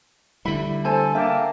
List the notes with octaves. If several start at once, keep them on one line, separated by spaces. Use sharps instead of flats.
D3 G3 E4 E5 B5
A4 C5 G#5 A5
A#3 D4 E5 G5 A5